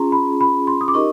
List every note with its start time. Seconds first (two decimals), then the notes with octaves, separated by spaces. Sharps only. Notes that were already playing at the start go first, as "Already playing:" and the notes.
Already playing: C#4 F4 G#4 A#5 C6
0.12 B5
0.41 B5
0.67 C6
0.81 D#6
0.88 D6
0.94 D#4 G4 A#4 D#5 C#6